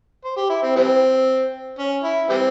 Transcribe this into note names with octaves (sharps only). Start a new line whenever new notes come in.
C5
G4
E4
C4
E3 G3 C4
C#4
E4
E3 G3 C4